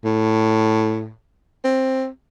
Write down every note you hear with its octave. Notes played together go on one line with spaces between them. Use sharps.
A2
C4